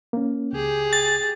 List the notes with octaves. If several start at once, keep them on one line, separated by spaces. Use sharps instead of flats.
A#3 C#4
C#2 G4 G#4
A6